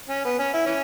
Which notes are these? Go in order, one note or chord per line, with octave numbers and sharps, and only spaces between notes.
C#4
B3
C#4
E4
E3 C#4